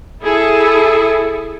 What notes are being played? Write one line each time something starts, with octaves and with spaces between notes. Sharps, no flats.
E4 G#4 A4